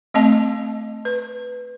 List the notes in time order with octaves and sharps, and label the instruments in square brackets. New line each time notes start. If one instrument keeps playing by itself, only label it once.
[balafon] A3 C4 D#5 A5
B4